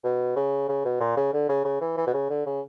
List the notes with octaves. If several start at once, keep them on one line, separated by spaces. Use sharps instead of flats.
B2
C#3
C#3
B2
A#2
C#3
D3
C#3
C#3
E3
E3
B2
C#3
D3
C#3